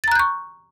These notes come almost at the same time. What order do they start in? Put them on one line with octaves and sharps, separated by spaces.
A6 A#5 F#6 G6 C#6